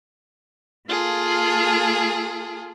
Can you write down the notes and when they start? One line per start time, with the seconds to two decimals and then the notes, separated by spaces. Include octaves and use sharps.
0.88 A#3 F4 G#4 A4